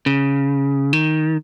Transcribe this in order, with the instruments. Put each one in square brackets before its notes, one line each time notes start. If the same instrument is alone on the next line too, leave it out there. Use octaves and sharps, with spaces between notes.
[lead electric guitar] C#3
D#3